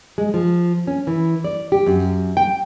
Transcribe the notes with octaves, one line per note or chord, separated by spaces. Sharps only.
G#3
F3
C#4
E3
D5
G4
F#2
G5